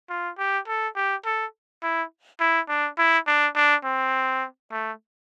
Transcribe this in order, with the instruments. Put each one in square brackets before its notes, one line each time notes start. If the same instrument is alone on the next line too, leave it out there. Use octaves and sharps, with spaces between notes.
[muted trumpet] F4
G4
A4
G4
A4
E4
E4
D4
E4
D4
D4
C4
A3